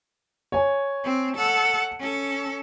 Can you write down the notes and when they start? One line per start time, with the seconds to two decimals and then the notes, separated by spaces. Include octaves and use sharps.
0.52 C#5 G#5
1.04 C4
1.37 A4 F#5
2.00 C#4 A4